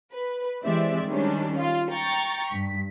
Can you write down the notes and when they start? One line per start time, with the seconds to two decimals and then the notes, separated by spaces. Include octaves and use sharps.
0.12 B4
0.65 E3 G#3 C4 G4 D5 E5
1.07 D#3 G3 G#3 C#4 D4
1.59 F4
1.92 G5 A#5 C#6 A6
2.51 G2 B6